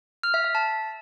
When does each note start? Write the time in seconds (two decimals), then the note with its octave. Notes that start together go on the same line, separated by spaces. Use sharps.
0.23 F6
0.34 E5
0.44 E5
0.55 A5